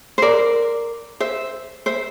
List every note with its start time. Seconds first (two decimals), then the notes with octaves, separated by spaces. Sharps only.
0.18 C5
0.22 A#4 D5
1.20 C5 E5
1.86 C5 E5